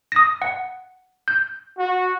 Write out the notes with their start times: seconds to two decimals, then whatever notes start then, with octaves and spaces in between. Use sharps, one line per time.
0.12 D#6 A#6
0.42 F#5
1.28 G6
1.78 F#4